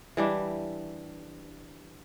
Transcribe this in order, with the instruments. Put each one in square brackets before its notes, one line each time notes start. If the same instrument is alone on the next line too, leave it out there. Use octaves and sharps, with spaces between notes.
[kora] E3 G3 D4